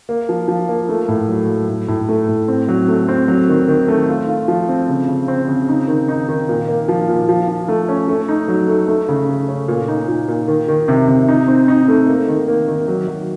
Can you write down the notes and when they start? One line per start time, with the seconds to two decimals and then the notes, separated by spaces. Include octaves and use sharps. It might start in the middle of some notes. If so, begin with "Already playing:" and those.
0.09 A#3
0.29 F3
0.48 F3
0.69 A#3
0.89 A3
1.08 A2
1.29 F#3
1.49 F#3
1.69 A2
1.88 A2
2.09 A3
2.29 A2
2.48 C4
2.68 F#3
2.88 A3
3.08 C4
3.28 F#3
3.49 D#3
3.68 D#3
3.88 A3
4.08 F4
4.29 F4
4.48 F3
4.69 C4
4.88 C#3
5.08 C#3
5.28 C4
5.48 C#3
5.68 D#4
5.88 D#3
6.08 D#4
6.28 D#3
6.49 A#2
6.69 A#3
6.89 F3
7.08 A#2
7.29 F3
7.48 F3
7.68 A3
7.89 C#4
8.08 A3
8.29 D#4
8.48 F#3
8.68 A3
8.88 A3
9.08 C#3
9.29 A3
9.48 C#4
9.68 A#2
9.88 D#4
10.08 A#2
10.28 A#2
10.48 D#3
10.68 D#3
10.88 C3
11.08 C3
11.28 D#4
11.48 C4
11.68 D#4
11.88 A3
12.08 A#3
12.28 D#3
12.48 A#3
12.68 D#3
12.88 F#3
13.08 F#3